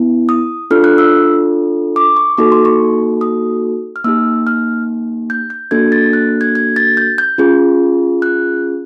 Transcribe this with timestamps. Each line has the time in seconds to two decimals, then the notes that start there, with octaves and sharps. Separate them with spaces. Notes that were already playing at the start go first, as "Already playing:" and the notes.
Already playing: B3 E4
0.29 D#6
0.71 D4 F4 A4 F6
0.84 F#6
0.98 E6
1.96 D6
2.16 C#6
2.38 A#3 D#4 F#4 A4 D6
2.52 C6
2.65 C#6
3.21 D#6
3.96 F6
4.04 A#3 D#4 G4 E6
4.47 F6
5.30 G6
5.50 G6
5.71 A#3 D4 F#4 A4 G#6
5.92 A6
6.13 F#6
6.41 G#6
6.55 G#6
6.76 A6
6.97 G6
7.18 G6
7.38 C#4 F4 G#4
8.22 F#6